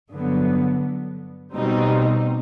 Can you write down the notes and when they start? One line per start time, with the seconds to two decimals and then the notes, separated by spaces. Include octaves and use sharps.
0.12 G2 D3 F#3 B3
1.54 B2 G3 C4 D#4